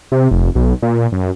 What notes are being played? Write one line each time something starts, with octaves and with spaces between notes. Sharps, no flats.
C3
F1
B1
A#2
F#2